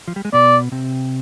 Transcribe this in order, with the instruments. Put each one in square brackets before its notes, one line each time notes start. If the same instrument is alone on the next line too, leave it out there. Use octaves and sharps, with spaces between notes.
[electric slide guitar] F3
G3
G#3
[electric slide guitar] B2 B3 [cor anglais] D5
[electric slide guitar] C3 C4